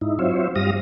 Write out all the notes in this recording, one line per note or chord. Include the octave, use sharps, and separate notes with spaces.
G#2 D#4 E4
F#3 C4 F4 C5 C#5 E5
G2 G3 F5 D#6 A#6